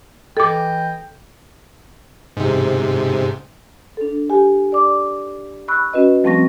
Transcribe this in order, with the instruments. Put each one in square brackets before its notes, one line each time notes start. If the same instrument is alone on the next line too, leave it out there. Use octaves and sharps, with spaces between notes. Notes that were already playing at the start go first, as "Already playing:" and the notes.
[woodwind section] E3 D#5 G5 [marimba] A4 D6
[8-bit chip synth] G#2 C3
[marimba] D4 A4
G4 G#5
D5 D6
B5 C#6 E6 F#6
C#4 F#4 B4 D#5
F3 G3 A3 C4 C#6 A#6